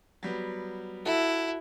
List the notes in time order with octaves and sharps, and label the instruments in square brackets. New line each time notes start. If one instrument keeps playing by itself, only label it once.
[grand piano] F#3 G3 B3
[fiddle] E4 [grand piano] F#4 A4